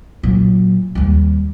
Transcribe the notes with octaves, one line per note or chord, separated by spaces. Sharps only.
A#2 F#3
D#2 G3